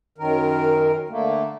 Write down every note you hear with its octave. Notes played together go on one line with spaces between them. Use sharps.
F#2 D#3 A#4
D3 A3 A#3